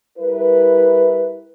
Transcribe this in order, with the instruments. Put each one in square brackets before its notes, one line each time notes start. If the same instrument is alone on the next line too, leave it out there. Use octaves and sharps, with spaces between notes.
[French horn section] G3 E4 A#4 B4